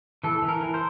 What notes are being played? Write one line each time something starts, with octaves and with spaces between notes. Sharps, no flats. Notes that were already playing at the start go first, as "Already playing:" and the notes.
E3 A4
E3
A#4
E3
C5